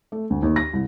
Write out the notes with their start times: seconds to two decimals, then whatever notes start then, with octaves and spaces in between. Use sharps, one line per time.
0.12 A3
0.30 D2
0.43 D#2
0.56 A#6
0.73 C2